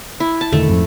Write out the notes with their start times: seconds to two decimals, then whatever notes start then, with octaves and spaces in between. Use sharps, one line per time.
0.20 E4
0.41 A5
0.53 E1 D3 D#3 A3
0.69 F2 G#2 F3